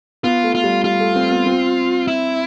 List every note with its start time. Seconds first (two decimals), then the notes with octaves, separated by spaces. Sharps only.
0.23 B3 F4
0.44 A3
0.55 F4
0.64 G3
0.84 G3 F4
1.00 A3
1.16 C4
1.31 B3
1.46 C4
2.08 E4